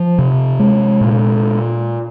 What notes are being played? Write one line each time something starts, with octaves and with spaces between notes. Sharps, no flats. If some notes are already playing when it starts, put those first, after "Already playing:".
Already playing: F3
C3
G#3
A#2